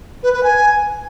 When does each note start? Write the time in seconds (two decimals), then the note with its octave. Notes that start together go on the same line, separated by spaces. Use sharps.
0.23 B4
0.33 B4
0.43 G#5